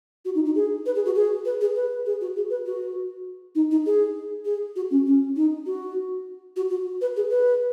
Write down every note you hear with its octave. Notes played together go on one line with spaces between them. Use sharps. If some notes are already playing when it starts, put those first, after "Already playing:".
F#4
D#4
D#4
G#4
B4
G#4
F#4
G#4
B4
G#4
B4
G#4
F#4
G#4
B4
F#4
D#4
D#4
G#4
G#4
F#4
C#4
C#4
D#4
F#4
F#4
F#4
B4
G#4
B4